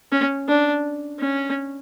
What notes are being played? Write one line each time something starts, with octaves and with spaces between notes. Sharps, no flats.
C#4
D4
C#4